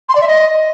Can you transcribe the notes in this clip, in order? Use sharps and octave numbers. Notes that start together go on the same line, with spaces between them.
C6
D5
E5
D#5